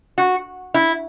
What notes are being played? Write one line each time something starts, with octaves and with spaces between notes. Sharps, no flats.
F#4
E4